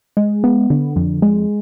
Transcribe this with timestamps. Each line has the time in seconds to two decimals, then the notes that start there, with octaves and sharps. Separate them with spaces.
0.17 G#3
0.44 B3
0.70 D3
0.96 F2
1.22 G#3